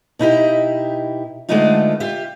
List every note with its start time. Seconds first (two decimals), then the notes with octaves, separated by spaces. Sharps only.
0.19 B2 D#4 E4 G4
1.49 D3 G#3 A3 B3 D#4 F4
2.00 F4 G4 E5